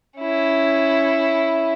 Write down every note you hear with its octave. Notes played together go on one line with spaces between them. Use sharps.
C#4 E4